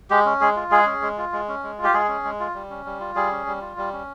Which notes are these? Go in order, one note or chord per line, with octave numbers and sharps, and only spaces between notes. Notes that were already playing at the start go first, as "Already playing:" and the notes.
G#3 G4
C#4
G#3 G#4
F4
G#3 G#4
C#4
G#3
F4
G#3
C#4
G#3
F4
G4
G#3 G#4
C#4
G#3
F4
G3
C#4
G3
F4
G3 G#4
C#4
G3
F4
G3
C#4